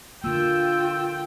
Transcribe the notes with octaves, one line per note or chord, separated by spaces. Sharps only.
D3 A#3 F4 G5 E6